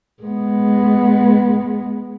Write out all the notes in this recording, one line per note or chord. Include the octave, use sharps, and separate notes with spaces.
G#3 B3